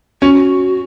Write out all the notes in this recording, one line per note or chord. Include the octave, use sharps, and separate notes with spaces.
C#4 F#4